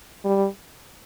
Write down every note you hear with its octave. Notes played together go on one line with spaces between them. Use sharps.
G3